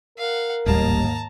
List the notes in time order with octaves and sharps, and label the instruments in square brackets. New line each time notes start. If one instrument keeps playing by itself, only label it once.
[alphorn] A#4 [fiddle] F5 F#5
[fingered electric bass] D1 A1 G3 [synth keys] D#2 G#2 A#3 [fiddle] A5 A#5